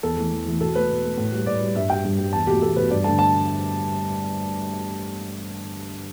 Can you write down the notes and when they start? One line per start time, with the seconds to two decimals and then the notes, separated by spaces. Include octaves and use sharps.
0.03 E2 A4
0.17 E3 A3
0.32 E2
0.46 E3 A3
0.61 B2 A4
0.75 A3 B4
0.89 B2
1.03 A3
1.17 A2
1.32 G3
1.46 A2 D5
1.61 G3
1.76 G2 E5
1.90 G3 G5
2.05 G2
2.19 G3
2.33 E2 A5
2.47 B2 A3 G4
2.62 E2 A4
2.76 B2 A3 B4
2.91 G2 D5
3.04 D3 A3 A5
3.19 A5